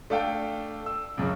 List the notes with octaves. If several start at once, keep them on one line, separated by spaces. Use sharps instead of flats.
A3 D4 A4 F5 G5
E6
C#2 F#2 C#3